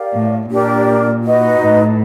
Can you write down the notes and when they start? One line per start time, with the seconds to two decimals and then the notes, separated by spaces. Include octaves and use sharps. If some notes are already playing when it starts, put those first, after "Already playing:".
Already playing: G4 A#4 D5 F5
0.14 A2
0.50 A#2 D4 G4 A#4 D5
1.23 D#4 F#4 B4 D#5
1.61 A2